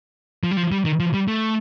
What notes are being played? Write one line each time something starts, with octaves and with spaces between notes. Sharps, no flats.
F3
G3
F3
G3
D#3
F3
G3
A3